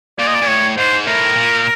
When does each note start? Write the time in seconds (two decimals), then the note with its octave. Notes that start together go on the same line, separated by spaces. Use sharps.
0.19 A#2 D5
0.27 D#5
0.34 D5
0.42 A#2
0.48 A2 C#5
0.77 G#2 C5
1.06 A2 A#4
1.36 A#2